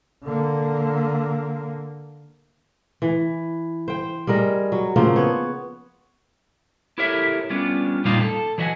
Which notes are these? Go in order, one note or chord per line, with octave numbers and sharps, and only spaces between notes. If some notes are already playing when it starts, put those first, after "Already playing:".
D3 A#3
E3
C5 G5
G3 G#4 A#4 D#5
F#3
C#3 F3 A#3 C4
B3 C#5
E4 G4 A4 A#4 C#5 E5
G3 B3 C#4 D4 F4
F2 A#2 G3 A#3 D#4 F4
A4
E3 F#3 D#5 E5 F#5 G#5